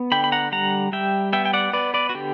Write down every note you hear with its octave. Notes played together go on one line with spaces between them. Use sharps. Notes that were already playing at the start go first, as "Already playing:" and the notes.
Already playing: B3
D3 G5 B5
B5
F#5 A#5
G3 F#5 A#5
G3 E5 G5
B3 E5 G5
G5
D5 F#5
B3 B4 D5
B4 D5
F#4
D3 G4